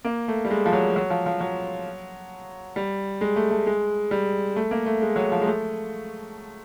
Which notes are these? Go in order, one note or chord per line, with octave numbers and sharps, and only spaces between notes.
A#3
A3
G3
G#3
F3
F#3
F#3
F3
F3
F#3
G3
G#3
A3
A3
G#3
G3
A3
A#3
A3
G#3
F#3
F3
G#3
A3